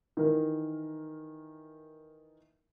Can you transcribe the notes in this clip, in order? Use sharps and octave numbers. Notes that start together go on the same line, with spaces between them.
D#3 E3 A#4